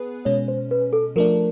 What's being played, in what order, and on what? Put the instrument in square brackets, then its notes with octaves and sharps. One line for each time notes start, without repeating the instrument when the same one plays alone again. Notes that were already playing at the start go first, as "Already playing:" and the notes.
Already playing: [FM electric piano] B3 G#4 B4
[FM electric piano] B2 G#3 C#4 [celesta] C#5
[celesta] C5
B4
A4
[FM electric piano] F3 A3 D4 [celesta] A#4